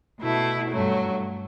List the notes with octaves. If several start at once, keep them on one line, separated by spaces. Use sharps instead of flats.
B2 A3 E4
G2 F#3 A3